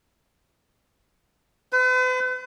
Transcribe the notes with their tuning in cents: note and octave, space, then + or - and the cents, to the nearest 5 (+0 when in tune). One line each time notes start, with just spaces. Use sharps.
B4 +45